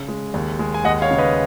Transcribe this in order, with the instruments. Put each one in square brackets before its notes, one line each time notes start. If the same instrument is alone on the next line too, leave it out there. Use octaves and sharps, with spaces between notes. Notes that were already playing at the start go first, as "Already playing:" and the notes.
Already playing: [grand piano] C#3
G#3
D#2
G#3
G#5
D#2 D#5 F#5
C#5 F5
C#3
B4 D#5